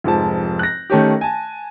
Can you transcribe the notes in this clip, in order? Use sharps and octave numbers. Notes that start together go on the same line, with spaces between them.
F1 G#2 F3 A5
F#6 A#6
D#3 A3 C#4 G4
G#5 A5